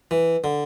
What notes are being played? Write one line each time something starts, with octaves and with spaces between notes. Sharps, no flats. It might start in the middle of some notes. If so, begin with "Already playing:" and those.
E3
D3